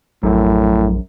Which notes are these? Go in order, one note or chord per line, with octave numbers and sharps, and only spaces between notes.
A#1 F#2 A2